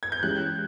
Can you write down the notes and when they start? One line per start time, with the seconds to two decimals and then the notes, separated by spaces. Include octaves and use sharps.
0.03 G#6
0.12 G6
0.23 E3 G#3 C#4 E4 G4 F#6